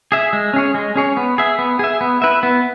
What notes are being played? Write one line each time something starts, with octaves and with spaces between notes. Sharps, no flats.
G#4 E5
G#3
C#4 G#4 C#5
G#3
C#4 G#4 C#5
B3
G#4 E5
B3
G#4 E5
B3
E4 B4 E5
B3